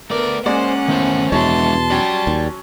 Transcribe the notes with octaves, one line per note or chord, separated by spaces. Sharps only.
A3 B3 A#4 D5
G#3 A#3 C#4 C5 D5 F#5
E2 D#3 A3 C5
E2 B2 G#3 D4 C#5 E5 A5 C6
F#3 C#4 D5 G5
D#2